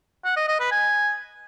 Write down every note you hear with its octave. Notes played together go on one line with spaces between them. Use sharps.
F#5
D#5
D#5
B4
G#5